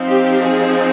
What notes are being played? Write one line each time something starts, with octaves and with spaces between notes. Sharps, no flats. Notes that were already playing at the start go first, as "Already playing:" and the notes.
Already playing: F3 C4 D#4
G4
G#4